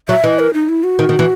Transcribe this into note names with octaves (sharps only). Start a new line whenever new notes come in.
F#3 E5
E3 D#5
A#4
D#4
E4
F#4
D#3
D#3
E3